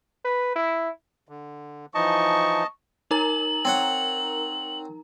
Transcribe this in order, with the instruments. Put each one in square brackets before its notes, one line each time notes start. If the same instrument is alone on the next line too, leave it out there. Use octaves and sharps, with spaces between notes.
[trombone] B4
E4
[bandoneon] D3
[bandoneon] E3 F3 D#4 [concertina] D#5 A5 [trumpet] C#6
[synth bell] D#4 A#4 A#5 [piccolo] F#7
[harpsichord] C4 C#5 F#5